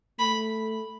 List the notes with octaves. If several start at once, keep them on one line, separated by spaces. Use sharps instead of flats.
A3 B5